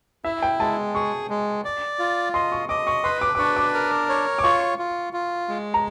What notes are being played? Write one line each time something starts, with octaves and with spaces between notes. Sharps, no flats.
E4 E5
G5
G#3 A5
G#4 C#6
G#3
D5
F4
D#5 C6
C#6
D#5 D6
C#6
B4 C6
D6
D6
D4 C#6
D6
A#4
C#5
D6
F4 C#6
F4
F4
G#3
A#5